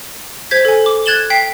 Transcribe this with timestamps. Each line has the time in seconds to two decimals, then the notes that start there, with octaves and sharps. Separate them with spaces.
0.51 C5 G6 G#6 B6
0.65 A4 G#5
0.86 D6
1.06 F#6 G#6 A6 E7 F#7 G7
1.30 G5 B6 C7